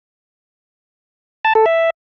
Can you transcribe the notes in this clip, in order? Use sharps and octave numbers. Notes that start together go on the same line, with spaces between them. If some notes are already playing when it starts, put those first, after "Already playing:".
A5
A4
E5